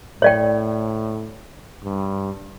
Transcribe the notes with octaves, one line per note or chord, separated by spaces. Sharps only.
A2 C#5 D5 G5
G2